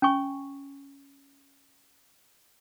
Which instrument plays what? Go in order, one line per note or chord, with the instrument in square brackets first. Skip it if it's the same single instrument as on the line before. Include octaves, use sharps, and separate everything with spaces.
[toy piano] C#4 G#5 C#6